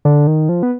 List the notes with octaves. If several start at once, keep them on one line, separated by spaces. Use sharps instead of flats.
D3
D#3
F3
B3